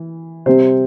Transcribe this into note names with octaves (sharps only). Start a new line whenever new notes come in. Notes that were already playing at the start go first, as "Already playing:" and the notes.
Already playing: E3
C3 G3 C4 C5